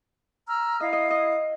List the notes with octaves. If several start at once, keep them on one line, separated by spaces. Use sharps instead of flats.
A#5 E6 F6
E4 D#5 F5
D#5
D#5